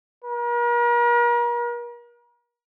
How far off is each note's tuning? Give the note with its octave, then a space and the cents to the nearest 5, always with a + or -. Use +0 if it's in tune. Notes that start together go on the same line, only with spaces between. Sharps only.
A#4 +40